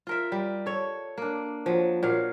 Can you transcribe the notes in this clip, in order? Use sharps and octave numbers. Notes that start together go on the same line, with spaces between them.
F4 A#4 E5
G3
A4 C#5
A#3 D4
F3 F#3
A#2 F#3 F5